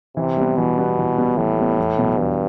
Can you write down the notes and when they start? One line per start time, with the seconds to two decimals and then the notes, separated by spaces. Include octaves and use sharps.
0.17 C3 E3
0.37 G3 B3
0.57 B2 E3
0.78 G3 B3
0.98 E3
1.17 G3 B3
1.37 A2 E3
1.58 G3 B3
1.78 E2
1.98 B2 F#3 B3
2.18 E2 G2